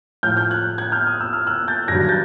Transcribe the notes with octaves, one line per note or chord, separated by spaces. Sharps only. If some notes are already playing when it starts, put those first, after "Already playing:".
A2 F3 F6 G6
F6 G6
F#6 G#6
F#6 G#6
F6 G6
D#6
E6
F6
E6 F#6
G6 A6
G2 D#3 F#3 G#6 A#6
G#6
G6 A6